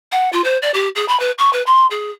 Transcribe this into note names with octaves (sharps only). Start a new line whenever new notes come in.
F#5
F4
C5
D5
G4
G#4
B5
B4
C#6
B4
C6
G#4